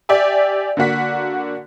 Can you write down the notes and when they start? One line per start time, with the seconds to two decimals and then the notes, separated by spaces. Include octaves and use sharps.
0.09 G4 D5 E5 G#5
0.77 D3 A#3 F#4 B6